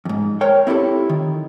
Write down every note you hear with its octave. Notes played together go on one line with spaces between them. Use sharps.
F2 G#2
A#4 C5 C#5 G5
C4 E4 F4 G4 A4
D#3